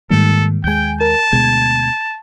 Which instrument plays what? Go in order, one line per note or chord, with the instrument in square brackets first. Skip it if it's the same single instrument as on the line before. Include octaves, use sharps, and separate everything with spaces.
[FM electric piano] G#2 D#3 [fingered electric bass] G3 A#3 [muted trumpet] A4
[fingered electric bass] D#2 G#3 [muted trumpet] G5 [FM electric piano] G#5 G6
[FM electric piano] A#4 [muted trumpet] A5
[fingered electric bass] D2 B2 G#3 [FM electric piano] G#6